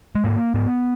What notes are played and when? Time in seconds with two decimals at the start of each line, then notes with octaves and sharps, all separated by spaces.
0.15 G#3
0.24 G#2 A#3
0.54 G#2 B3